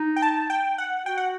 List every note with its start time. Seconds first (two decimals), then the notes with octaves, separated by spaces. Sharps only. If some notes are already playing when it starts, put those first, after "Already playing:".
Already playing: D#4
0.16 G5
0.22 A5
0.50 G5
0.78 F#5
1.06 F#4 G5
1.17 F#5